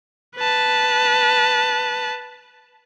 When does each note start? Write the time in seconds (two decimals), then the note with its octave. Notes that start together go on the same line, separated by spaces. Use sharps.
0.36 B4 A5